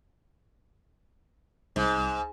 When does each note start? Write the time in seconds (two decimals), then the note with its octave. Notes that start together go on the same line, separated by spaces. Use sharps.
1.76 C2 G#2